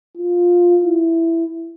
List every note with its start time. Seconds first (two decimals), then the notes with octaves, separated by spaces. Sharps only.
0.17 F4
0.84 E4